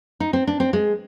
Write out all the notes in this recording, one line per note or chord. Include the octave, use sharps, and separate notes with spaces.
D#4
C4
D4
C4
G#3